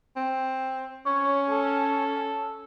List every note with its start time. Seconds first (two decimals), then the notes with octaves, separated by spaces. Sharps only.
0.16 C4
1.06 C#4 C#5
1.50 A4